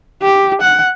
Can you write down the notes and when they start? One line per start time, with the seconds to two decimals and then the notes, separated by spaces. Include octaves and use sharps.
0.22 G4
0.62 F#5